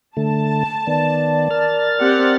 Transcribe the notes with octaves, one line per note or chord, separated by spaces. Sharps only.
D3 A3 A5
D#3 B3 D5
A#4 F6 A6
C4 G4 F#5